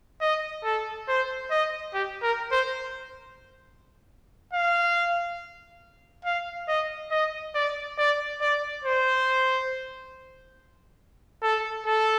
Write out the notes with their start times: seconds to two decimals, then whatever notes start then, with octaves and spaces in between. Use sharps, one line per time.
0.22 D#5
0.64 A4
1.08 C5
1.51 D#5
1.94 G4
2.23 A#4
2.52 C5
4.53 F5
6.25 F5
6.68 D#5
7.12 D#5
7.55 D5
7.98 D5
8.41 D5
8.84 C5
11.43 A4
11.86 A4